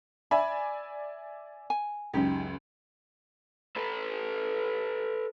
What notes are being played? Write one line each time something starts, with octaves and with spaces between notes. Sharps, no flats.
D5 E5 G#5 B5
G#5
C#2 F#2 D#4 G4
A4 B4